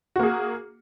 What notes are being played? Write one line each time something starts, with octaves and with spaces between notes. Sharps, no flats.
A#3 F#4 G#4